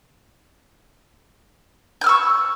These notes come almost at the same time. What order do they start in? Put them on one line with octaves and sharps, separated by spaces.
G6 F6 E6 C#6